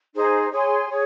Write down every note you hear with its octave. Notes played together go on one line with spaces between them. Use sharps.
D#4 G#4 C5
G#4 C#5 G#5 C6
G#4 C#5